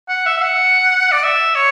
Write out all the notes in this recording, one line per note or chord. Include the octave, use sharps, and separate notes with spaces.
F#5
E5
E5
F#5
D5
E5
C#5